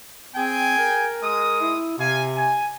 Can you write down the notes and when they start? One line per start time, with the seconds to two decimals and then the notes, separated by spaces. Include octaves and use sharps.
0.35 C4 G#4 G5 G#5
0.78 A#4
1.22 G#3 D#6
1.61 E4
1.98 C3 F5 G#5
2.35 G#5